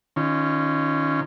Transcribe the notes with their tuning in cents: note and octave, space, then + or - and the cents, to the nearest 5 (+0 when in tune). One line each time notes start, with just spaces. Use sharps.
D#3 -20 C#4 +0 F4 -30